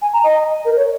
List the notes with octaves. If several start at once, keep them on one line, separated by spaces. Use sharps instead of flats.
G#5
A#5
D#5
A#4
C#5